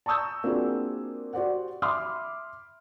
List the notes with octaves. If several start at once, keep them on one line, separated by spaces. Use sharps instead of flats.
A5 A#5 C#6 D#6 E6 G6
A#3 C4 D4 F4 F#4 G#4
F#4 G4 C5 D5 F#5
E5 B5 C6 D6 D#6 F6